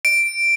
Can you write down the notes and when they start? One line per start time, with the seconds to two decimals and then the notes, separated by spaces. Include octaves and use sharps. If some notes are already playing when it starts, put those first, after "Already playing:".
0.05 D7